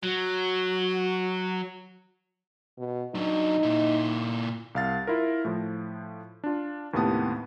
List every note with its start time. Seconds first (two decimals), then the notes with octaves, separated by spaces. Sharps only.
0.03 F#3 F#4
2.78 B2
3.15 F#3 D4 D#4
3.63 A#2 E4
4.75 C2 F5 A6
5.07 E4 F4 A#4
5.45 A2 F3
6.44 D4 F4
6.93 D#2 A2 C3 B3 A5 D#6